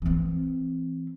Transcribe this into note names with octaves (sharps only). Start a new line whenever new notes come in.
E3 C4